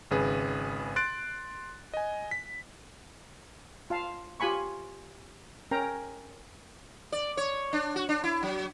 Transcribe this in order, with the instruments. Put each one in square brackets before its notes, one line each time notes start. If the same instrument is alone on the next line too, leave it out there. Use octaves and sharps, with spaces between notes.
[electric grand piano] G#1 C#3 G#4 B4
C6 F#6 A6 D7
D#5 G#5
B6
[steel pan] F4 F5 A5
F4 G4 G#5 B5 C#6
C#4 A#4 G5 A#5
[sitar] D5
C#5
D4
F#4
D4
E4
F#3